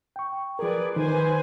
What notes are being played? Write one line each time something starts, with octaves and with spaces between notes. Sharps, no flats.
G5 C#6
F3 G#4 A#4 B4 D5
D#3 B4 C5 G#5